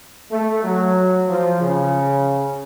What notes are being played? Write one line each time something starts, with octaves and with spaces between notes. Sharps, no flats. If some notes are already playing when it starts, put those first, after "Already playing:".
A3
F#3
F3
C#3